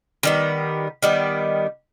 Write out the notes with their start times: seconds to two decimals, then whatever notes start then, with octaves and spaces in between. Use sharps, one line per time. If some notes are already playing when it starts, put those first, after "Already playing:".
0.23 D#3 G3 B3
1.03 D#3 G3 B3